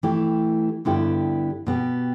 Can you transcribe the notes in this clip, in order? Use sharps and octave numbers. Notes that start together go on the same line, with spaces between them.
E3 A3 E4 G4
G2 D3 B3 E4 G4
B2 B3 G4